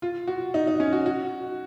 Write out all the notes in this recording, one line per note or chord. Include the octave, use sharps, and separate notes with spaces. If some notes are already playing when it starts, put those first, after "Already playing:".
F4
F#4
D#4
D#4
C#4
F#4
F#4